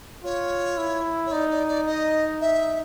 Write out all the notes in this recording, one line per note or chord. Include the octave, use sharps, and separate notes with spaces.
F4 C#5
E4
C#5
D#4 D5
D5
D5
D#5
E5